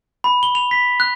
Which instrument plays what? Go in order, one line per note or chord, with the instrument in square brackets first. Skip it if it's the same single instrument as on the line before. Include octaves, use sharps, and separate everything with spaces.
[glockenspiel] B5
G7
F7
B6
F#6